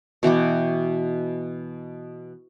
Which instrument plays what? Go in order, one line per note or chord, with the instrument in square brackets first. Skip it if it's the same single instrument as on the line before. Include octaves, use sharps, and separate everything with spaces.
[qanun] B2 E3 G5 D6